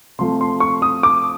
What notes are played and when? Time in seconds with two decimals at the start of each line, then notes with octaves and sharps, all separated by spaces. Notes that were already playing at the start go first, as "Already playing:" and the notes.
0.19 C3 F3 A3 C6
0.41 C6
0.60 C#6
0.82 D#6
1.03 D6